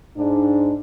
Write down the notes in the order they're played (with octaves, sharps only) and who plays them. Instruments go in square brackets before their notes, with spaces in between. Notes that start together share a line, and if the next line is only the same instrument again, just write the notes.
[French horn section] G#2 D4